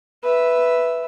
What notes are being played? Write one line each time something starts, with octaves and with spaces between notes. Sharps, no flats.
B4 E5